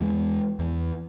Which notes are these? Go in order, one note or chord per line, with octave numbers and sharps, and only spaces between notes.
E2 G#3
E2